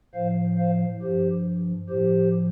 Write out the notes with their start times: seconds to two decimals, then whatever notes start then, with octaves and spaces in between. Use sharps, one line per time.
0.14 A2 F3 C5 F5
0.58 C5 F5
1.02 G2 F3 G4 C5
1.89 A2 F3 G4 C5